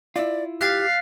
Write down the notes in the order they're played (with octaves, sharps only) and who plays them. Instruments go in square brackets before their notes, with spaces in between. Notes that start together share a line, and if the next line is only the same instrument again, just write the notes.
[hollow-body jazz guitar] E4 F4 [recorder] D5
[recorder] G4 [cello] F5 [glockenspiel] F#6 A6 B6